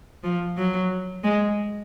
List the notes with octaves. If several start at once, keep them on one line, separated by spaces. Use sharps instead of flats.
F3
F#3
G#3